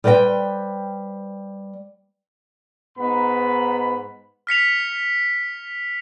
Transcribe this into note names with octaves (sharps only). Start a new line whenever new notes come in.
G3 B4 C5 D#5 G5
G#2 B3 D#4 B5
F6 B6 C#7 F7